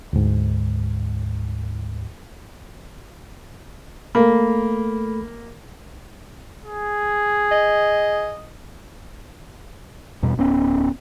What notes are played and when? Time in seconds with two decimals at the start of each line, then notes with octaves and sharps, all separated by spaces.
0.13 D2 G#2
4.15 A3 A#3 A4 B5
6.65 G#4
7.51 D#5
10.23 E2 B2 G3
10.38 D1 B3 C#4